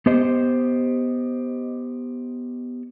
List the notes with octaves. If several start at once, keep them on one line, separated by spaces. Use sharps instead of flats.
B3 G4 C5 D#5